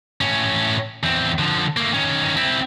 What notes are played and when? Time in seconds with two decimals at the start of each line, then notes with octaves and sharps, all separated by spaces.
0.21 A2 C#4
1.03 E2 C4
1.39 D3 F3
1.77 A3 A#3
1.94 D#3 C#4
2.37 C4 E4